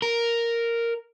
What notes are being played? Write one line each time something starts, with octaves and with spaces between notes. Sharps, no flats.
A#4